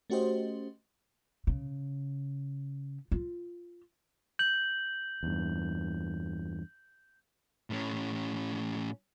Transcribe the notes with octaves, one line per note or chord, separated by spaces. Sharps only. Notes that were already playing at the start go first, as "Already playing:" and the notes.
A3 C#4 F#4 G4 C5 D#5
C#3
F4
G6 F#7
E2 G2
A2 C#4